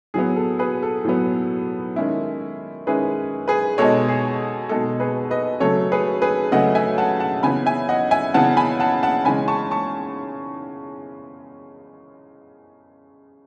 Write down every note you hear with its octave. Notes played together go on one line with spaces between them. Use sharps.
A2 F#3 B3 G#4
A4
G#4 B4
A4
A2 F#3 B3
D#3 G#3 C#4 E4
D#3 G#3 C#4 E4 G#4 B4
G#4 B4
B2 G#3 D#4 A4 C#5
G#4
B2 G#3 D#4 A4
G#4 B4
B4 D#5
C#3 F#3 A3 A4 C#5
G#4 B4
G#4 B4
C#3 F#3 A3 D#5 F#5
E5 G#5
F#5 A5
F#5 A5
C#3 E3 B3 G#5 B5
E5 G#5
D#5 F#5
E5 G#5
C#3 E3 B3 F#5 A5
G#5 B5
F#5 A5
F#5 A5
C#3 E3 G#3 C#4 G#5 B5
A5 C#6
A5 C#6